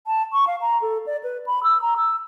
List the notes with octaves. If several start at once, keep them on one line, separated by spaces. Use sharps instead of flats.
A5
C#6
F5
A#5
A4
D5
B4
B5
E6
A#5
E6